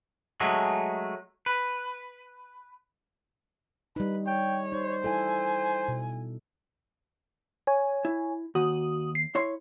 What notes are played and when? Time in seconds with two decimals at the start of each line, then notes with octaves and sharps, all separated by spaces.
0.40 F#3 G#3 A3 G#4
1.46 B4
3.96 G3 D#4 B4
4.26 C#5 G5
4.72 D#4 C5
5.04 E4 A4 G#5
5.88 B2
7.67 C#5 G#5
8.05 E4
8.55 D#2 F#4 D#6
9.15 C7
9.35 E4 C#5 C6